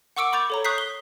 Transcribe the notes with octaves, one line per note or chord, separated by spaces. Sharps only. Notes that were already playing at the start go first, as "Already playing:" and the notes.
F#5 C#6 D6 E6 C#7 D7
B5 C#6 D6 G6 A6 F7
A4 C#5 A#5
C#6 D#6 F#6 G6 B6 C7
G7